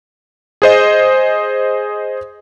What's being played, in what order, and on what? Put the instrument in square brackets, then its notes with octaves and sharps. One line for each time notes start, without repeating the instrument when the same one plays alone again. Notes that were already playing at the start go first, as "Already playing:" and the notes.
[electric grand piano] G#4 C5 D#5